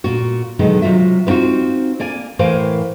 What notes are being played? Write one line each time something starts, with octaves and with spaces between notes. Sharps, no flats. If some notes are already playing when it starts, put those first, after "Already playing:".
A#2 F#4
B2 D3 D#3 F#3 G#3 B3
C3 F#3 F4 F#4 E5
B3 C4 D#4 F4 F#4
A#3 D5 G#5
A2 E3 A#4 C5 F5 G#5